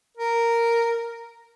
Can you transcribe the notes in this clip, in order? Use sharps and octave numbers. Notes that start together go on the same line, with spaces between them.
A#4